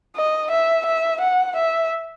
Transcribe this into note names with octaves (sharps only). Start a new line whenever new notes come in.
D#5
E5
E5
F#5
E5